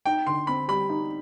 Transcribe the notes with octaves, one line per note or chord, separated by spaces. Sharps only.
D#4 G5
D3 C6
C4 B5
G3 B5
D#4